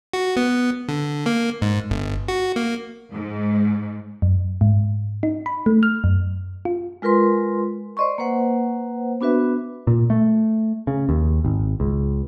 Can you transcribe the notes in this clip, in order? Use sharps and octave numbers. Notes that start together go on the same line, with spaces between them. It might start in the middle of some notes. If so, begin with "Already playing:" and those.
F#4
B3
D3
A#3
G#2
G1
F#4
A#3
G#2
F#2
G#2
D#4
B5
A3
F6
F#2
F4
G#3 F4 A#4 B4 C6
C5 D5 D#5 C6 C#6
A#3 B4 C5 F#5
B3 D4 F#4 B4 E5
A#2
A3
C#3
D#2
G#1
C#2